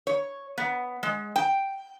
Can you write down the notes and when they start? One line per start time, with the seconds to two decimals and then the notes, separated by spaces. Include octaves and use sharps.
0.07 C#5
0.58 B3
1.03 G#3
1.36 G5